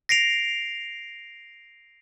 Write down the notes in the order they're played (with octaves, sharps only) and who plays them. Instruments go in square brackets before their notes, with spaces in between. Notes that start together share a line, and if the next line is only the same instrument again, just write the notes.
[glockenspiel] A#6 C7 D7 F7